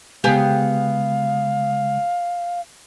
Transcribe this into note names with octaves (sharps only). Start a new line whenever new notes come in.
C#3 G#3 B3 G4 G#4 F5